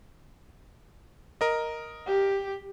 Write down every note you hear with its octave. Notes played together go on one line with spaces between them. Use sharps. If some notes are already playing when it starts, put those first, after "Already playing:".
A#4 D#5
G4